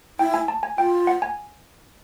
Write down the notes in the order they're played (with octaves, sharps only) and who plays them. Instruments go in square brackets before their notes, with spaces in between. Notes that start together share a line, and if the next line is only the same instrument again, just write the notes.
[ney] E4 [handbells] G5
[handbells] G#5
A5
G#5
[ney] F4 [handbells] G5
[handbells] F#5
G#5